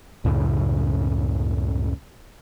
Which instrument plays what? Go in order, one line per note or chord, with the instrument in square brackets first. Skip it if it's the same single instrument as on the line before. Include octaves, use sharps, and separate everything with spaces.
[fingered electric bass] C#2 F#2 A2 C#3